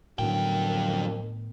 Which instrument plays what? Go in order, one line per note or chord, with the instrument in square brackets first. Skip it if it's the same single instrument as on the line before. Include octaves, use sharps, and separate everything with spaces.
[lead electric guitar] F2 G5 [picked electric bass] A2 D#3 B3 [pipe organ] D3 F#3 [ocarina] A#4